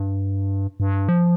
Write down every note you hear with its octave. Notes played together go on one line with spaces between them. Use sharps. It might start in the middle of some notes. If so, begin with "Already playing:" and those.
Already playing: G2
G2
F3